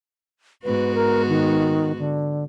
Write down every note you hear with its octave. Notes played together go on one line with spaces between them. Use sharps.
G#2 B3 F#4 B4
A#4
D#3
D3